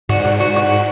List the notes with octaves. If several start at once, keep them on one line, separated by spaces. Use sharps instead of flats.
G#2 F#4
F#4
F#4
F#4